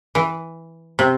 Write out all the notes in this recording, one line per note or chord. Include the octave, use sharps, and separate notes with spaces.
E3
C3